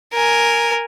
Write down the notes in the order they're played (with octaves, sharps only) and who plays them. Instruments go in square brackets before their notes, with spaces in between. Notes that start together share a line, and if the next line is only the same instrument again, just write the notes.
[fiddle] A#4 G#5